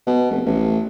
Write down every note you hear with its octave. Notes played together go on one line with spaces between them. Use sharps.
B2
F1
A1